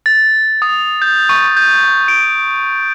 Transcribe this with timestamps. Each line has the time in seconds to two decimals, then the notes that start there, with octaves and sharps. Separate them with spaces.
0.06 A6
0.62 D#6
1.02 G6
1.29 C#6
1.57 G6
2.08 D7